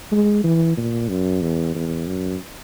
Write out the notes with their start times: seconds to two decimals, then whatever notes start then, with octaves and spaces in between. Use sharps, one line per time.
0.12 G#3
0.44 E3
0.77 A#2
1.10 F#2
1.42 E2
1.75 E2
2.07 F#2